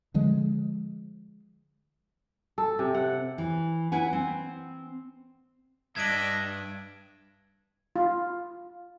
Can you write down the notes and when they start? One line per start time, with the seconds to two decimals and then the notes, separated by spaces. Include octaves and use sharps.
0.14 D3 F3 G#3
2.58 A4
2.79 C3
2.94 F#5
3.38 E3
3.92 E4 B4 F#5 G#5
4.13 C4
5.96 G2 D4 D#5 E5 G#6 D7
7.96 F4